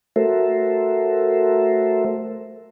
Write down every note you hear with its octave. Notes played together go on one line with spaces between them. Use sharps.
A3 F#4 A4 A#4 C5 E5